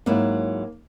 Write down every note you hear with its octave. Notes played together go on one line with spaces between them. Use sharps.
G#2 F#3 A#3 E4